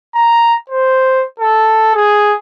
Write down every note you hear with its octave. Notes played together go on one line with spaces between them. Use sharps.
A#5
C5
A4
G#4